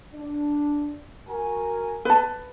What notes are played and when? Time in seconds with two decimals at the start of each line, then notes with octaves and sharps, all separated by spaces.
0.14 D4
1.28 F#4 A#4 G#5
2.05 B4 A5